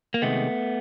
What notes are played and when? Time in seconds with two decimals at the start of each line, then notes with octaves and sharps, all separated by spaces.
0.14 A#3
0.22 C3 D#3 G#3 A3 B3